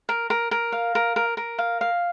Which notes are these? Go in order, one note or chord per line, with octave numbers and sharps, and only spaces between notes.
A#4
A#4
A#4
F5
A#4
A#4
A#4
F5
F5